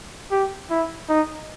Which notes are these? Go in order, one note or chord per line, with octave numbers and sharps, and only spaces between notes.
G4
E4
D#4